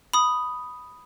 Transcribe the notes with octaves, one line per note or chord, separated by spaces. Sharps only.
B5 D#6